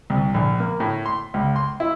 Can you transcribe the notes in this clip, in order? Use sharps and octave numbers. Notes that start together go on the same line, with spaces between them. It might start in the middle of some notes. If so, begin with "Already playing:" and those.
C2
A#1
A#3
A2
C6
C#2
C6
E4